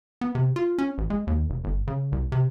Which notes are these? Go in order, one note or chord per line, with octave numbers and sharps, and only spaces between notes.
B3
C3
F4
C#4
A1
G#3
D#2
F1
G1
C#3
C2
C3